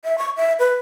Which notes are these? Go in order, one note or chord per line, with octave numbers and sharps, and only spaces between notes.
E5
C#6
E5
B4